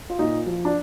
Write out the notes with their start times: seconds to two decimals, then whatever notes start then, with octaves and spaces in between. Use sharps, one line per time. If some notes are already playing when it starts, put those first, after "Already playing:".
0.10 F4
0.19 A#2 D#4
0.46 F3
0.65 D4